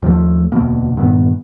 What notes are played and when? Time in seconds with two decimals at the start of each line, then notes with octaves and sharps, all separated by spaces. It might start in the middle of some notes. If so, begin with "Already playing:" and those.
0.02 D#2 F3 F#3 A3
0.52 E1 D2 B2 A#3
0.97 G2 A#2 D#3 B3